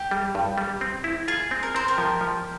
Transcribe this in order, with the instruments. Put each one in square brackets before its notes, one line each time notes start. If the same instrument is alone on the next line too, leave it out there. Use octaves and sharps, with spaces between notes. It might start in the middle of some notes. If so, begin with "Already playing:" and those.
Already playing: [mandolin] G4
[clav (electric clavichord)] G3
G2
G3
C4
E4
[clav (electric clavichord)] F4 [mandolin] G#4
[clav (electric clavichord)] C4
[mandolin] A#4
[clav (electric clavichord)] C4 [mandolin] C5
[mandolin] G4 A#4
[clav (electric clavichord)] F3
F3